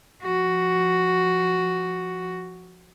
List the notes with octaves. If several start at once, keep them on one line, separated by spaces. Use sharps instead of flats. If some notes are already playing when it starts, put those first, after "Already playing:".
F3 F#4